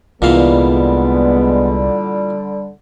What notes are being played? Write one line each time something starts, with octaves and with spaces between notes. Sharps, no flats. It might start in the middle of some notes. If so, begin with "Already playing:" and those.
C2 A#2 D3 E3 G3 G#3 B3 F5